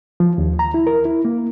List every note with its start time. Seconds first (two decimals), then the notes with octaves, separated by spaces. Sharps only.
0.20 F3
0.38 D#2
0.59 A#5
0.74 E4
0.87 A#4
1.05 E4
1.25 A#3